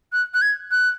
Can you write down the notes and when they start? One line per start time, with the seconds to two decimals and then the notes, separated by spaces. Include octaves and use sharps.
0.13 F#6
0.34 F#6
0.42 G#6
0.71 F#6